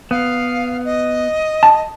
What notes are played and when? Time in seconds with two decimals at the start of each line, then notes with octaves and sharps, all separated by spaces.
0.11 B3 F5
0.85 D#5
1.63 A5